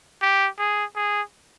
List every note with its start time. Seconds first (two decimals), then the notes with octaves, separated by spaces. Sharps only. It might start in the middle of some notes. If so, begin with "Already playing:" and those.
0.22 G4
0.59 G#4
0.96 G#4